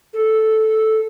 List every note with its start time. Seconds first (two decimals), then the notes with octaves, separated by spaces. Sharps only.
0.14 A4